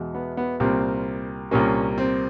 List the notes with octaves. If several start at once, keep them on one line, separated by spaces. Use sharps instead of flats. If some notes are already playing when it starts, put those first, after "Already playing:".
Already playing: E2 B2 G#3
B3
B3
C2 A#2 G3 A#3 C4
C2 A#2 G3 A#3 C#4
C4